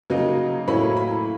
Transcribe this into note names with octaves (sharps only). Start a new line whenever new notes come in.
C#3 F#3 A#3 D#4
A2 F#3 A#3 C#4 E4 B5
B5